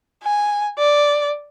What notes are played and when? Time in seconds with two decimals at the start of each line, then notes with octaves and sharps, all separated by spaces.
0.24 G#5
0.78 D5